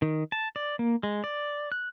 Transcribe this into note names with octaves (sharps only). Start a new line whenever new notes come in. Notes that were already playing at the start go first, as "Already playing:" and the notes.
D#3
A5
D5
A#3
G#3
D5
F#6